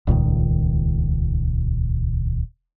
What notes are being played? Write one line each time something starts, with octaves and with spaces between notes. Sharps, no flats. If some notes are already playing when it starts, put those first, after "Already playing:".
D#1 C#2 A#2 D#3